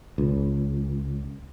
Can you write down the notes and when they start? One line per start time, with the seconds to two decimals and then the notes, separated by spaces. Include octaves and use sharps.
0.18 C#2